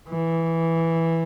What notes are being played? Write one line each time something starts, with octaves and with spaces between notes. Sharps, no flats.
E3